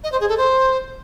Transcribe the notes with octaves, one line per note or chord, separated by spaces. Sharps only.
D#5
C5
G#4
A4
C5